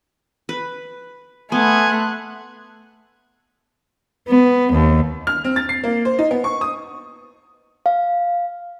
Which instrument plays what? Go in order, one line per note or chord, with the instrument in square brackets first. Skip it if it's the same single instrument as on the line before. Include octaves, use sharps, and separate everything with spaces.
[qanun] B4
[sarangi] A3 [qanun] B3 [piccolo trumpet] G#5 [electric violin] C6 F#6
[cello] B3
D#2
[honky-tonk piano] F6
C4
A6
C7
A#3
C5
D#4
B3
C#6
D#6
[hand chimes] F5